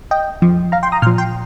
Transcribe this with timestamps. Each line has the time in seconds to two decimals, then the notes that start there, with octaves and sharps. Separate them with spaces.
0.11 D#5 G5
0.42 F2 F3
0.72 F5 A#5
0.83 G5 C6
0.92 A#5 D#6
1.02 A#2 C6 F6
1.07 F3
1.18 G5 C6